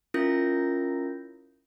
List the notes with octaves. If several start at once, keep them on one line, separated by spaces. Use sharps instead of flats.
C#4 E4 F4 A#4 G6 A#6